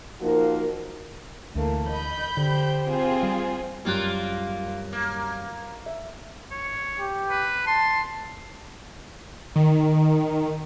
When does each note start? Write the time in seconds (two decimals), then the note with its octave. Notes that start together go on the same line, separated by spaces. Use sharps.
0.20 F3 A#3 D#4 F#4 A#4
1.55 D2 E3 A3 A#3
1.89 D#5 B5 G6
2.37 D3 G4 C5
2.85 C4 F4 G#4
3.23 G3
3.85 F#2 G3 A#3 F4 F#6
4.93 A#3
5.86 E5
6.51 C#5
6.99 G4
7.30 B4
7.67 A5 C6
9.56 D#3